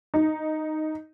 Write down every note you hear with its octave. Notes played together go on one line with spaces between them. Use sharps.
D#4